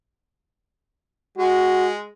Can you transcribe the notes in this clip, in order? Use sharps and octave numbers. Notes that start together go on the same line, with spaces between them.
G#3 F#4